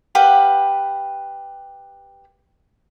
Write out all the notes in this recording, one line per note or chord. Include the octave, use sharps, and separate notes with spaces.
G4 B4 F5 F#5